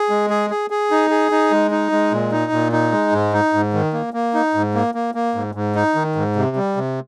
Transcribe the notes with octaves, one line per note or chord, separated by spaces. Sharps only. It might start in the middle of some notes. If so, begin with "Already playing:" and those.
Already playing: G#4
G#3
G#4
G#4
G#4
D#4
G#4
D#4
G#3
D#4
G#3
A#2
D#4
A#2
D#4
G#3
G#2
D#4
G#2
D#3
A#3
A#3
D#4
G#2
A#3
A#3
A#3
G#2
G#2
D#4
D#3
G#2
C3
G3
C3